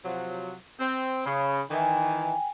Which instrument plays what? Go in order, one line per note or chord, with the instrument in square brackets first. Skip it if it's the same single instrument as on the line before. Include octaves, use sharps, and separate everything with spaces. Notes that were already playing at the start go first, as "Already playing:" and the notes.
[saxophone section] C3 F3 F#3
C4
[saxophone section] C#3 [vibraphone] B5
[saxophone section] D#3 E3 [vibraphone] G5 G#5